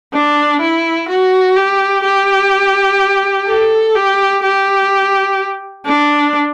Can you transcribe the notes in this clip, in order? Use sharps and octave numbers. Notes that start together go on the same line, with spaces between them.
D4
E4
F#4
G4
G4
A4
G4
G4
D4